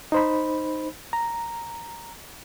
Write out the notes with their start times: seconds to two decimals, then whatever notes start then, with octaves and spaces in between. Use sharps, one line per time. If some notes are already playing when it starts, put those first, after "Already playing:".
0.12 D#4 C5 B5
1.13 A#5